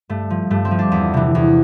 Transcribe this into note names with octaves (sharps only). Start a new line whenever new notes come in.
G2 A3
F3
G2 A3
C4
F3
D4
E2 E4
C3 E3
E2